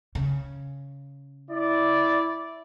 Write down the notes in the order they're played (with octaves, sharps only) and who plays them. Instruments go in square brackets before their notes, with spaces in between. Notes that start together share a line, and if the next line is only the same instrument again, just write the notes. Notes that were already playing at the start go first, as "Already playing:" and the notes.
[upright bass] C#3
[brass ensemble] E4 D5